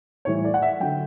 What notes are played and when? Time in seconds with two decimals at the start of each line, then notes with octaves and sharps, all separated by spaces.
0.25 A2 E3 G3 C#5
0.45 D5
0.54 F#5
0.62 E5
0.80 D3 F#3 G5